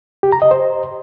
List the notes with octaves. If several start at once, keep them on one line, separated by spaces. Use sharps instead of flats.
G4
A#5
D#5
C5